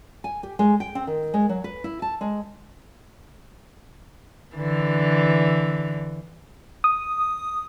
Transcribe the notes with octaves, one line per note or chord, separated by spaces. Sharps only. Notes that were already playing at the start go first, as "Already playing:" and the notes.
G#5
G4
G#3
G5
C4
D#3
G#3
F#3
B4
E4
A5
G#3
D3 E3
D#6